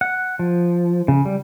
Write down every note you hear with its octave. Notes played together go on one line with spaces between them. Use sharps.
F#5
F3
C#3
G3